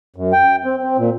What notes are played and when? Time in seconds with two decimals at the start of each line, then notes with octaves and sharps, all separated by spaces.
0.16 F#2
0.33 G5
0.65 C4
0.83 C4
0.98 A#2